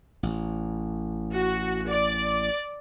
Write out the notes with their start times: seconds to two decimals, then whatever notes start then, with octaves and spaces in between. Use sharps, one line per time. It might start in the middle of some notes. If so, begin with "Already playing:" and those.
0.23 A1
1.35 F#4
1.89 D5